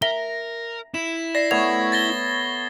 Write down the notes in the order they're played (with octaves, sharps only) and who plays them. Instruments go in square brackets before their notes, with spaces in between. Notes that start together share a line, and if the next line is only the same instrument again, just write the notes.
[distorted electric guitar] A#4 [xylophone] E5 G7 [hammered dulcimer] A#5
[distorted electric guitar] E4 [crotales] E7
[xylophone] D5 [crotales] A#6 C7
[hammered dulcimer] A3 B3 C#5 [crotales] G#6 [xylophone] F7
[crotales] A6 A#6 G7